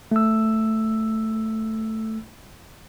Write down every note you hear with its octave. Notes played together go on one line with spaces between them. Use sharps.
A3 E6